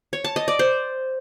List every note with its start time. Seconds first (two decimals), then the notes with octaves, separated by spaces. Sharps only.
0.13 C#5
0.24 A5
0.36 D#5
0.48 D5
0.59 C5